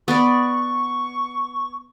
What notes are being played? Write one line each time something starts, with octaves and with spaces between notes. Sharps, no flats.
B3 B4 D5 C#6